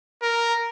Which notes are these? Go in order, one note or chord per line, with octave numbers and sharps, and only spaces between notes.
A#4